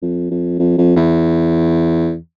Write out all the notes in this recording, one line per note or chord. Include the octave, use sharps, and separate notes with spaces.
F2
F2
F2
F2
E2